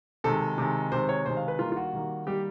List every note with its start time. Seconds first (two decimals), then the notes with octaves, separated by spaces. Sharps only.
0.24 C3 D#3 G#3 A4
0.58 C3 D#3 G#3
0.92 C3 D#3 G#3 C5
1.09 C#5
1.26 C3 D#3 G#3 C5
1.37 F5
1.48 B4
1.59 D#3 G3 A#3 F4
1.72 F4
1.76 F#4
1.93 D#3 G3 A#3
2.27 D#3 G3 A#3 G4